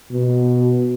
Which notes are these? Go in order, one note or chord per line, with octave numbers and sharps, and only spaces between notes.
B2